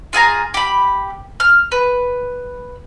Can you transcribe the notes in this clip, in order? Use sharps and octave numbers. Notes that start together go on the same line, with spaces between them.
F4 G#4 G#5 A#5
G4 B5
F6
B4